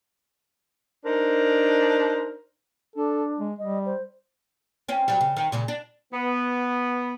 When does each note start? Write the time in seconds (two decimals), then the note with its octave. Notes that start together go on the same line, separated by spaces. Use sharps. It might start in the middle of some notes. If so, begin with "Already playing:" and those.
1.05 D4 D#4 A#4 C5
2.96 D4 A4
3.38 G#3
3.59 G3 D#5
3.86 C5
4.88 C4 C#4
5.08 F#3 G3
5.21 C#3
5.36 D#3
5.52 A#2 C#3 G#3
5.68 D4
6.13 B3